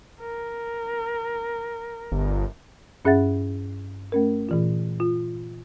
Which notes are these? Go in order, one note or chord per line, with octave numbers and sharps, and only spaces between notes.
A#4
G1
G2 C#4 G#4 E5 F#5 A6
A3 C#4 A#4
A#2 E3 F4
F4